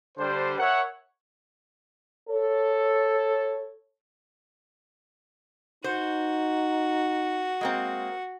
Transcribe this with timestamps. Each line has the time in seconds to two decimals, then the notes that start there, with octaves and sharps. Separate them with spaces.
0.18 D3 G3 D4 C5
0.59 A#4 C#5 E5 F#5
2.29 A4 C#5
5.84 D#4 F#4 C5
7.61 G#3 A#3 C4